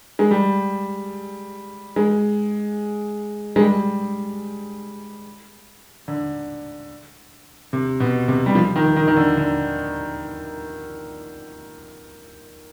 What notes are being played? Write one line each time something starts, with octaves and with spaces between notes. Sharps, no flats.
G#3
G3
G#3
G#3
G3
D3
C3
B2
C3
G3
F3
D#3
D#3
D#3
D3
D3